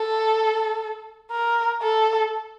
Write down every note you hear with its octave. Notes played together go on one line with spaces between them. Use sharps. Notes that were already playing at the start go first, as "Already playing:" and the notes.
Already playing: A4
A#4
A4